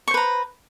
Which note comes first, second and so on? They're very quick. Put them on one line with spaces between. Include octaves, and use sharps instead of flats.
C#6 C5 B4 A#5